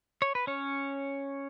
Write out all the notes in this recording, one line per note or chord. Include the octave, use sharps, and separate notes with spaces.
C#5
B4
C#4 C#5